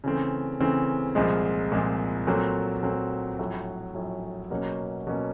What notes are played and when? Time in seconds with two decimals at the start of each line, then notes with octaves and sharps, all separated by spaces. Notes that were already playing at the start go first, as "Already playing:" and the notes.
0.04 C#3 E3 A3 C4
0.60 C#3 E3 A3 C4
1.15 C2 A#2 F3 G#3 C4
1.72 C2 A#2 F3 G#3 C4
2.27 A#2 F#3 A3 C4
2.83 A#2 F#3 A3 C4
3.39 A#1 A2 F#3
3.95 A#1 A2 F#3
4.50 B2 F#3 A#3 C#4
5.07 B2 F#3 A#3 C#4